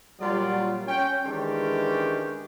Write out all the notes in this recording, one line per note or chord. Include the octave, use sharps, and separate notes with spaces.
A#2 F#3 G3 F4 D5
C#4 G5
D#3 E3 G#3 C#4 D4 G4